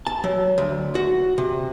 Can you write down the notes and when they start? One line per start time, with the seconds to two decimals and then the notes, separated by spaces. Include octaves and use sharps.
0.07 A5
0.24 F#3
0.58 D2
0.95 F#4
1.38 C3